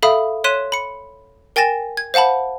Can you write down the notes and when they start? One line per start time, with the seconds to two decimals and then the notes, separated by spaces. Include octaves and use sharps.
0.03 A4 E5 F5 B5 D#6
0.44 C#5 C6 F#6 B6 D#7 E7
0.72 B5 C#7
1.56 A#4 G5 G#5 A6 A#6 E7
1.97 G#6
2.14 C5 F5 F#5 A5 B5